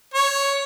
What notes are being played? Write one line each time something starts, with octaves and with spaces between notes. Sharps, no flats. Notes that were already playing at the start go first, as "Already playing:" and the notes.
C#5